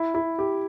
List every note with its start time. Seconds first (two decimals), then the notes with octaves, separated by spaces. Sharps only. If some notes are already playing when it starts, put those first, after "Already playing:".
Already playing: E4
0.15 E4
0.39 G4